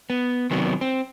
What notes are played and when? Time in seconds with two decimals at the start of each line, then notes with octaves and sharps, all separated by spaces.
0.10 B3
0.51 C3 D#3 F#3 B3
0.81 C4